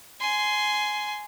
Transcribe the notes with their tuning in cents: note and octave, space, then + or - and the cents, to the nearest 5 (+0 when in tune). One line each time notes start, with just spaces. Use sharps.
G#5 +10 C6 -10